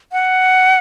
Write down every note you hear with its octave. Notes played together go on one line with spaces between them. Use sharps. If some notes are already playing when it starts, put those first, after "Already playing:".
F#5